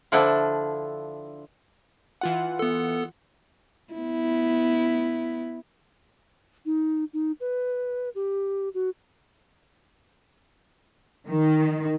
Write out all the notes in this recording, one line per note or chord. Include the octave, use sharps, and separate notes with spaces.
D3 F3 D4 E4 A4
E3 F4 F#5
B3 A4
B3 E4
D#4
D#4
B4
G4
F#4
D#3